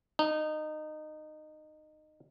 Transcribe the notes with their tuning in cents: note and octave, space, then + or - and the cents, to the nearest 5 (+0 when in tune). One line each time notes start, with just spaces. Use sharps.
D#4 -20